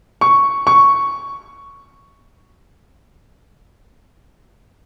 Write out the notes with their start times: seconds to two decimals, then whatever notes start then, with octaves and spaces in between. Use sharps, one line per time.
0.21 C#6
0.67 C#6